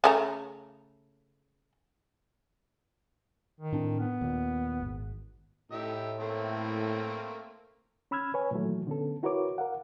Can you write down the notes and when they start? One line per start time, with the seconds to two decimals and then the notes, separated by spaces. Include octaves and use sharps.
0.04 C#3 A3 A#5
3.60 D#3
3.72 A2 C4 D4
4.00 B3
4.21 D#2 A#2
4.81 G#1
5.72 A2 D#4 G4 E5
6.20 A3 A#3 C4
8.11 C#4 B5 E6 F6 G#6
8.34 B4 C#5 G#5
8.51 A#2 D#3 E3 F#3 A3
8.87 D3 B3 C#4 A4
9.23 E4 F#4 A#4 B4 C#5 D6
9.58 A#4 F5 F#5